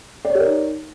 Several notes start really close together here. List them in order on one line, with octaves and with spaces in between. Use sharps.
D5 C#5 G4 A#4 D#4